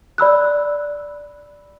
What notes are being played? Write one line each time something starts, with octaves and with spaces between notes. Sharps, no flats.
D5 B5 E6 F#6